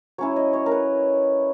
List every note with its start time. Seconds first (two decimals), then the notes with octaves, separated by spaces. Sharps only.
0.18 F#3 C#4 E4 C#5
0.36 D#5
0.53 C#5
0.66 A#4
0.72 B4